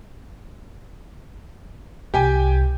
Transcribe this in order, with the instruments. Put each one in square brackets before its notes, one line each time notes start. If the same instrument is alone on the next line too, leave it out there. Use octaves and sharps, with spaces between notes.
[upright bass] C2 [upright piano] G4 G5 G#5